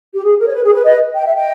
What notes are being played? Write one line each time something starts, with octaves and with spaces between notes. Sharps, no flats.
G4
G#4
A#4
C#5
B4
G#4
B4
B4 D#5
G5
E5
D#5 G5